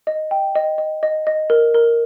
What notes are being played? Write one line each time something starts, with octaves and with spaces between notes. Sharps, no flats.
D#5
G5
D#5
D#5
D#5
D#5
A#4
A#4